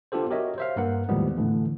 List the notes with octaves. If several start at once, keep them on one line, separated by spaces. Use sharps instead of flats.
B3 D4 F4 G4 A4 C5
F#4 G4 A#4 C#5 D#5 E5
C5 E5 F5
G2 A#3 A#4 B4 F#5
D#2 A2 F3 G3 G#3 B3
A2 D3 E3 A3